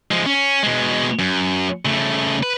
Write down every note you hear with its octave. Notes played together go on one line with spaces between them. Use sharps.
F3 G#3
C#4
B2 G#3
F#2
C#3 A3
B4